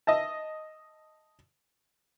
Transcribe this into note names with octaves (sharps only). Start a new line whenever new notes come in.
D#5 E5 A5